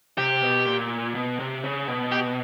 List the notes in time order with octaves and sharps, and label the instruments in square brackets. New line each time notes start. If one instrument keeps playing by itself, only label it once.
[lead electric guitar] C3 [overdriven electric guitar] G4
[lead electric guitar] B2
A#2
B2
C3
C#3
B2
[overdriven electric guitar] G4